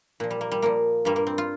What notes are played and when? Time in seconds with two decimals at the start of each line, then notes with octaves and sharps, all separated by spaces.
0.20 A#2 F3
0.30 G3
0.41 A#3
0.51 G3
0.62 A#2 F3 A#3
1.05 G2 G3 A#3
1.16 A#3
1.27 C4
1.38 F4